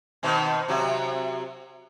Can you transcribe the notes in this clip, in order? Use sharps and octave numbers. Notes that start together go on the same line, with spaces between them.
B2 D#3 C4
C3 F#3 F#4